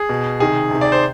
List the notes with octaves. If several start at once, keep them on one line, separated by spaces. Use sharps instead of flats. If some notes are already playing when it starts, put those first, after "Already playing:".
Already playing: G#4
B2
C3 D#3 G#4
C3 D#3
D5
C5